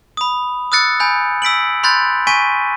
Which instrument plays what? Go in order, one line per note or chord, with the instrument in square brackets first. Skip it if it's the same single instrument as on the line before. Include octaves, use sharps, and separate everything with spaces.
[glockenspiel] B5 D#6
D#6 E6 F#6 A6 C#7
G#5 B5 G6
E6 B6 D7 F#7
B5 C6 F#6 G6 A6
G#5 C#6 B6 D#7